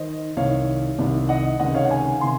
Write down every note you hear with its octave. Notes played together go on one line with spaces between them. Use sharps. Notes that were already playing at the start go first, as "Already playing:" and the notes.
Already playing: D#3 C5 D#5
C2 C3 D#3 C#5 F5
C2 C3 D#3
D#5 F#5
C#2 C3 D#3 D#5 F#5
C#5 F5
F#5
F5 G#5
C3 D#3 G#5 C6